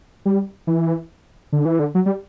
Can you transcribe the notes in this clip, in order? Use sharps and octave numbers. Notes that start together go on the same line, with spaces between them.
G3
E3
D3
E3
D3
F#3
G3